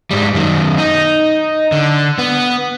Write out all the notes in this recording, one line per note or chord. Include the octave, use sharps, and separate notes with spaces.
G#2 G3
F#2 D#3
D#4
D3
B3